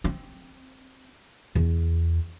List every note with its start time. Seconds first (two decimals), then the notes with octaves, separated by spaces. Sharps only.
0.04 C4
1.55 E2